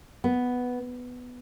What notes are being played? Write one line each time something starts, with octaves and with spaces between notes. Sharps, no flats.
B3